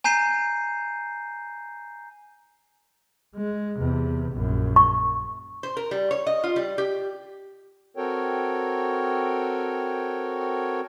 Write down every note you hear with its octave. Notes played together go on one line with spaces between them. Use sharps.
G#5 A#5 G6 C7 D#7
G#3
E2 C3
A#1 F#2
C#6
C5
A#4
G3
C#5
D#5
F4
G3
G4
C4 F#4 A4 A#4 C#5 G5